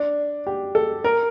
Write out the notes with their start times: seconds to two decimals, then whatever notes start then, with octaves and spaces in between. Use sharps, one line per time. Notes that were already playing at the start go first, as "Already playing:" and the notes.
Already playing: D4
0.47 G4
0.75 A4
1.04 A#4